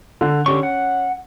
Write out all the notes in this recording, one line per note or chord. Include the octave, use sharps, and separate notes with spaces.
D3
D3 C#4 G4 C#6
F#5